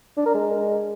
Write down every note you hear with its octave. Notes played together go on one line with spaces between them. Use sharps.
D4
A#4
G#3